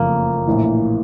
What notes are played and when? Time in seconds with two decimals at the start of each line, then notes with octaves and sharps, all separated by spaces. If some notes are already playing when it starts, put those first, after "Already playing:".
Already playing: F#1 F2 C#3 F3 A3 A#3
0.47 A#1 A2 E3